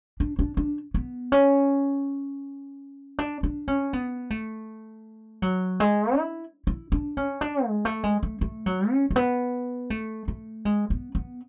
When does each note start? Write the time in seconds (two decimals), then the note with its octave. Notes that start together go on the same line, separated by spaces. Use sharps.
0.20 D4
0.39 D4
0.57 D4
0.94 B3
1.32 C#4
3.19 D4
3.43 D4
3.68 C#4
3.93 B3
4.30 A3
5.42 F#3
5.80 G#3
6.17 E4
6.67 E4
6.92 D4
7.17 C#4
7.41 D4
7.66 G#3
7.85 A3
8.03 G#3
8.23 A3
8.41 A3
8.66 F#3
8.91 C#4
9.11 A3
9.16 B3
9.90 A3
10.28 A3
10.65 G#3
10.90 B3
11.15 B3